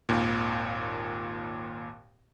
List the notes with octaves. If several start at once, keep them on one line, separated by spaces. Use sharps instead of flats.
G#1 D#2 A#2